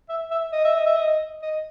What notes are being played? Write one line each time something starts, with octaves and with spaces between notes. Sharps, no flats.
E5
E5
D#5
E5
D#5
E5
D#5
D#5